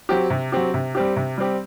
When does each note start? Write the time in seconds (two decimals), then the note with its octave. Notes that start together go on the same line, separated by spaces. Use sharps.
0.09 F#3 C4 G4
0.30 C3
0.52 F#3 C4 G4
0.74 C3
0.95 G3 C4 G4
1.16 C3
1.38 G3 C4 G4